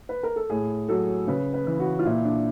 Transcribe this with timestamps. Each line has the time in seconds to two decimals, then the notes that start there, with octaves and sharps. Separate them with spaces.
0.09 B4
0.23 A#4
0.36 A4
0.50 A2 G#4
0.89 F#3 A4
1.27 C#3 B4
1.54 B4
1.67 E3
1.80 F#4
1.99 F4
2.05 A#2 E4
2.25 D4